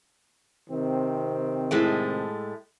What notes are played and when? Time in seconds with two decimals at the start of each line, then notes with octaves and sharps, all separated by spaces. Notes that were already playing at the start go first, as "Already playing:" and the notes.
0.70 C3 D#3 C4
1.71 A2 G#3 A3